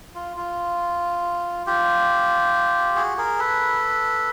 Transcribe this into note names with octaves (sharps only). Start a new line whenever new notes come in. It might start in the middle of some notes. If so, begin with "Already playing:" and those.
F4
F4
F4 G4
F#4 G#4
G#4 A#4
A4 B4